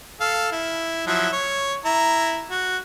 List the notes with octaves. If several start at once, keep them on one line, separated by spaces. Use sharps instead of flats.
A4 F5
E4
F3 F#3 E4
C#5
E4 A#5
F#4